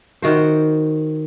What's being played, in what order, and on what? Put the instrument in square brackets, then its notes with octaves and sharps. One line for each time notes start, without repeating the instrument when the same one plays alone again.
[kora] D#3 F#4 C5